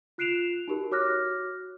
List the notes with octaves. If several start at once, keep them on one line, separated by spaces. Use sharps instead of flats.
F4 F#6 C7 D7 E7 F7
D#4 F#4 G4 A#4
F#4 C#5 D6 F6 F#6 A#6